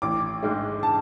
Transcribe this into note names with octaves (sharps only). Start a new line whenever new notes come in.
A1 D6
G#2 G#3
A5